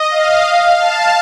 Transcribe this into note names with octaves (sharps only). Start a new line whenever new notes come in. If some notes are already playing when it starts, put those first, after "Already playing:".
Already playing: D#5
F5
A5